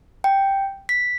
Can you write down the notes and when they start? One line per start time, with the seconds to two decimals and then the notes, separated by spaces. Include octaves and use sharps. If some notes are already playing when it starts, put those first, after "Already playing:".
0.24 G5
0.89 B6